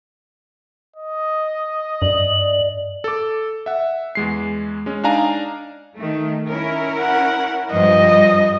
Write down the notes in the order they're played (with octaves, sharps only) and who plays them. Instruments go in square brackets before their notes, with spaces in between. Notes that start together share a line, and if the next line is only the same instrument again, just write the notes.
[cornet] D#5
[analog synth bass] G2 [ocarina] D5 [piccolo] F#7
[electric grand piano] A4 D6
E5 F#5
E2 G#3 C7
G#3 C#4
D4 D#4 D5 F5 G#5 A#5
[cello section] D#3 A3
C#4 E4 A#4
[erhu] F#5
[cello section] G2 F3 [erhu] D#5